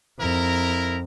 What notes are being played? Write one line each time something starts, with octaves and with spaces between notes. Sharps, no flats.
F2 E4 A#4 A#5